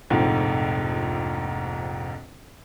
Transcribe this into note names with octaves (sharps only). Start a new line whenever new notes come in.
F1 A#1 F2 G#2